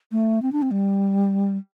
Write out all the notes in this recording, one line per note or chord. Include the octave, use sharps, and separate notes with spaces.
A3
C4
D4
C4
G3